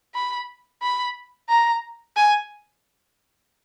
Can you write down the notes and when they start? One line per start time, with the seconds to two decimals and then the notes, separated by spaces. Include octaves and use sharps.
0.15 B5
0.82 B5
1.49 A#5
2.17 G#5